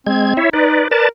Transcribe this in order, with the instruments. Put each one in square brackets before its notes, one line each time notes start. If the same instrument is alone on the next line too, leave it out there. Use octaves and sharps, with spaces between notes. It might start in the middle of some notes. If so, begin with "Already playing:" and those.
[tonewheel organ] G#3 G#6 [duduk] C4
[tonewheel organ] E4 C#5 E5
[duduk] D#4 [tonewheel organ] B4 D5
[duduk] A#4 [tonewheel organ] B4 D5 A5